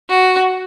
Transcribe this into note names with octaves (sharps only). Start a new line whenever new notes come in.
F#4